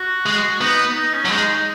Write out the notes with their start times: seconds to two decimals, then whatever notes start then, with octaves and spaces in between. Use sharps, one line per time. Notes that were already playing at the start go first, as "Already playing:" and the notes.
Already playing: F#4
0.26 G#3
0.61 B3 D#4
0.96 D#4
1.13 C#4
1.25 F#3
1.31 G#3 D#4
1.48 D#4